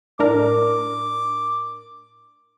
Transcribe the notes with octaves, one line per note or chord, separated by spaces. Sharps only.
A2 D4 A#4 D6